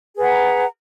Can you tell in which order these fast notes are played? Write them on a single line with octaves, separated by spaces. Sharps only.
G#4 B4 F#5 A#5